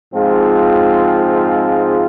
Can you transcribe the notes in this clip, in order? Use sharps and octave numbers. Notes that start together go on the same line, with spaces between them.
G#2 F3 G#3 C4 F4